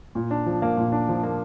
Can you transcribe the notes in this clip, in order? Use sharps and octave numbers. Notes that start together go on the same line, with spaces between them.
A#2
D4
F3
A#3
A#2
D4
F3
A#3